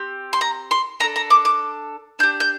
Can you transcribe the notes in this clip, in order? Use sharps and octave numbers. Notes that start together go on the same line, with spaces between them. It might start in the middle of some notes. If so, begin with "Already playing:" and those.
Already playing: C4 G4
C6
A#5
C6
D4 A4 A#5
A#5
D6
D6
D4 G4 G6
G6